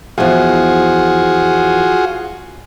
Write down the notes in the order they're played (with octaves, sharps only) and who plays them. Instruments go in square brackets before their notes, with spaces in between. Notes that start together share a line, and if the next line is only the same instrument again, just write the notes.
[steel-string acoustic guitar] E2 F3 [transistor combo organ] F4 F#4 G#4